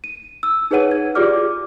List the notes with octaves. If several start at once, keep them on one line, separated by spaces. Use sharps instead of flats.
D#7
E6
D#4 G#4 B4 C#5 F#5 D#7
G#6
F4 G4 G#4 D5 D6 F6